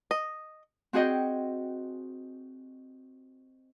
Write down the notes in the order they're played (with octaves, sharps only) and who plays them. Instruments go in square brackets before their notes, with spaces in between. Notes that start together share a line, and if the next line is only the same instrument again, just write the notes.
[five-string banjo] D#5
[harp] C4 F#4 G#4 D#5 G5